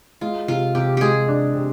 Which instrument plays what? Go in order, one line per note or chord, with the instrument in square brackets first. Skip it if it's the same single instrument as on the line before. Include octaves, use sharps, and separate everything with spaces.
[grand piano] G#3 [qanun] F4
[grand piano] C3 [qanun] F4
[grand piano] C3 [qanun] G4
[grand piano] G#3 [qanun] G4 G#4
[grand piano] D4
C3